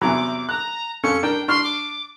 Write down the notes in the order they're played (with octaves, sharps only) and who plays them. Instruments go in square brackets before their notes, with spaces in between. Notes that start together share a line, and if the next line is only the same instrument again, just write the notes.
[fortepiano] E2 C3 F#3 [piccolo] D6
[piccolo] A#5 [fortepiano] F#6
[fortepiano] F2 C#4 A4 [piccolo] C#7
[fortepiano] D4 A#4 [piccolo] G5
[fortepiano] D4 C#6 F6 [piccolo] C6
[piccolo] D6